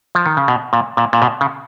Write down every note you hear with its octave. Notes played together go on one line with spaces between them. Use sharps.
F3
D#3
C#3
B2
A#2
A#2
A#2
B2
C#3